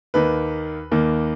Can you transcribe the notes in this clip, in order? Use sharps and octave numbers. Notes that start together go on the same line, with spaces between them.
D#2 D#3 A#3 B4
D#2 D#3 A#3